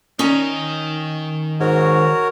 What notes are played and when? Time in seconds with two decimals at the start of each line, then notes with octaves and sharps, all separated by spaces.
0.19 D#3 C#4 D#5 A#5
1.60 G#2 F#4 A#4 C#5